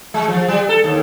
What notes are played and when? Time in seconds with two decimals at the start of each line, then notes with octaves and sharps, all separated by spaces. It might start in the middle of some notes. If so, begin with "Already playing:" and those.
0.14 G#3
0.28 F3
0.48 G3
0.69 A4
0.84 D#2